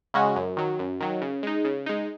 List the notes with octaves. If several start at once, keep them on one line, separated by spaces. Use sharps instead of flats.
C#3 G#3 C#4 F#4
F#2
D#3 F#3
F#2
D#3 F#3
C#3
G#3 D#4
C#3
G#3 D#4